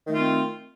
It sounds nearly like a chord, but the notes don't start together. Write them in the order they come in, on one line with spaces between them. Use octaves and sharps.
D#3 A3 F4 C4